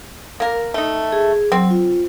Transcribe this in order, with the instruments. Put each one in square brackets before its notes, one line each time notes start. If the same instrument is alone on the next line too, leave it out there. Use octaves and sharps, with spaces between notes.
[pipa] A#3 A#4
A3 D#4
[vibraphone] G#4
[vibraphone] F#3 [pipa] C4
[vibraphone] F4